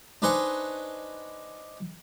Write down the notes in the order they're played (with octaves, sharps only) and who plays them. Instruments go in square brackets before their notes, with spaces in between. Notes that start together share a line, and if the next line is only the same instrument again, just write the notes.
[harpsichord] D4 D#4 B4 C5 G#5 C#6